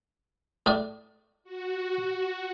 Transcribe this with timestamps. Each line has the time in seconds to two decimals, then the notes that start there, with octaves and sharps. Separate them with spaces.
0.66 A2 D4 D5
1.44 F#4